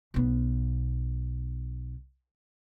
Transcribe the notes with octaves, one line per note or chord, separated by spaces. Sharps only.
B1 B3